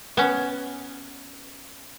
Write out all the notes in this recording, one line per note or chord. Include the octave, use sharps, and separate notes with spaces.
B3 C#4